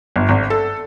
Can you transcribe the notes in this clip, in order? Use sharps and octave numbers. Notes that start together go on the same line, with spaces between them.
G1
G#1
A4